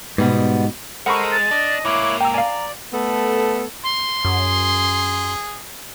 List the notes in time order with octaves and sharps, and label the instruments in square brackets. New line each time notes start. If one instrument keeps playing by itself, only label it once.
[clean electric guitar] G#2 [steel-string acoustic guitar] B2 G3 B3
[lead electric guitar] G#3 [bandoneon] A4 A#4 C5 [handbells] F#5 B5 C#6
[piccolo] A6
[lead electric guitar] D4 [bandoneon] D#5
[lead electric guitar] G#2 A#3 [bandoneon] E4 C#5 F#6 [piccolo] D6
[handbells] G5 E6 [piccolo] A#5
[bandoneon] D5 [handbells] F5 G#5
[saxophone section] A3 B3 A4
[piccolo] C6
[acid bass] F#2 [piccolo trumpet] G#4